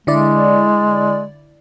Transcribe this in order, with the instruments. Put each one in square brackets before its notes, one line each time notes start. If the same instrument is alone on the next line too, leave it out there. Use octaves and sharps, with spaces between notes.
[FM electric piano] D3 E4 D5 [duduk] G#3